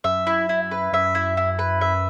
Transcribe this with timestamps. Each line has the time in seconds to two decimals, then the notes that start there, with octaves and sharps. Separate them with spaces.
0.04 F#2 E5
0.27 E4
0.49 E4
0.71 B4
0.93 F#2 E5
1.15 E4
1.37 E4
1.59 B4
1.81 E5